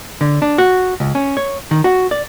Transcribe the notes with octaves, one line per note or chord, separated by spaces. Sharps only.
D3
D4
F#4
C#2
C#4
C#5
D#3
F#4
D5